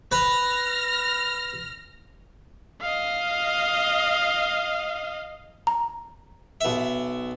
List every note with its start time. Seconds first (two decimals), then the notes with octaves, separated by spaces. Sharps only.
0.12 B4 F6 A#6
2.81 D#5 F5
5.67 A#5
6.61 B1 E5